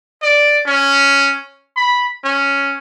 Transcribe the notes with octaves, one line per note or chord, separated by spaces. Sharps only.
D5
C#4
B5
C#4